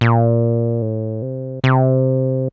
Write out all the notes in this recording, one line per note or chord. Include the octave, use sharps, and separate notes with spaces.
A#2
A2
C3
C3